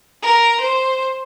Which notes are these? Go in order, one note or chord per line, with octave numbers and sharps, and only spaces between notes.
A#4
C5